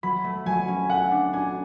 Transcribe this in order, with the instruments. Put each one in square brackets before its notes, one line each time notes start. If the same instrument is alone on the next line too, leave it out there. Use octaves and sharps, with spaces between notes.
[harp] F#3 [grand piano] B5
[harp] A3
[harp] F#3 [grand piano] G#5
[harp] C#4
[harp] A3 [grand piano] F#5
[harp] D4
[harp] D4 [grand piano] G#5